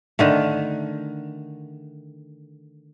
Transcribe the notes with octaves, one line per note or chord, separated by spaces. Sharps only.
D3 D#3 A3